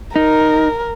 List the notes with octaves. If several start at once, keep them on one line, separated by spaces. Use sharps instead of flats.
D#4 A#4